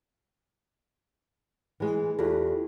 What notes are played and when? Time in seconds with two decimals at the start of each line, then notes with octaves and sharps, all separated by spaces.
1.80 E3 G#3
2.19 E2 F4 G4 A4